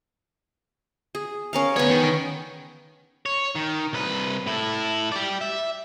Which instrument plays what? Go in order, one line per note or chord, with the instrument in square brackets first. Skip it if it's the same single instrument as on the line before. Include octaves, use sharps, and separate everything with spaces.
[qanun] G#4
C#4 A#4 F5
[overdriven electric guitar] D2 C#5 [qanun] B3 C#4
[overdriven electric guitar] D#3
[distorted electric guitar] C#5
D#3
C2 B4
A2 E4
G4 D5
E5